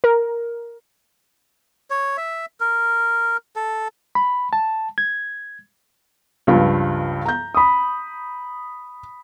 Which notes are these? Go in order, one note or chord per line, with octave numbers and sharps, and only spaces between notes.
A#4
C#5
E5
A#4
A4
B5
A5
G#6
C#2 G2 F3
A#5 G6
B5 D#6